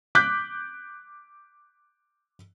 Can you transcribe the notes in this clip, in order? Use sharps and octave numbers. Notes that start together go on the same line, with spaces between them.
D6 F#6 G6 B6